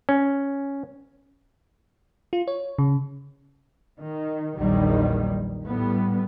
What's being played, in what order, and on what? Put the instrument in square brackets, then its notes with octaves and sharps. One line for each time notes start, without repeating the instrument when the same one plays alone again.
[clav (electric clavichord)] C#4
[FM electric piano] F4
C#5
C#3
[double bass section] D#3
A#1 E2 D#3 F#3 G3
A2 G3 B3